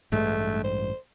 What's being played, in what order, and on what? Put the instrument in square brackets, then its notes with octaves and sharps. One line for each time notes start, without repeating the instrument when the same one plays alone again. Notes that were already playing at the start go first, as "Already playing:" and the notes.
[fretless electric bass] A1 G2 G#3 [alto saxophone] A3
[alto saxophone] C5